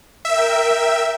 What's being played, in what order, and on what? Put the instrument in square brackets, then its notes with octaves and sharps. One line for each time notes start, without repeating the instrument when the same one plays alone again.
[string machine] A#4 G5 [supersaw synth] E5